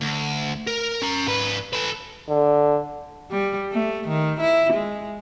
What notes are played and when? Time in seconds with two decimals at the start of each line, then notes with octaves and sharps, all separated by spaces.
0.01 D2
0.67 A#4
1.02 C#4 A#5
1.26 G#2 B4
1.73 A4 B4
2.29 D3
3.31 G3
3.72 A3
4.08 D#3
4.40 E4
4.73 G#3